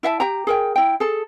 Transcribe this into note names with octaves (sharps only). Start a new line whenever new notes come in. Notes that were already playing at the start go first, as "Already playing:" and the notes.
E4 E5 F5 A5
G4 G5 A#5
G#4 A#4 G5
E4 G5
G#4 A4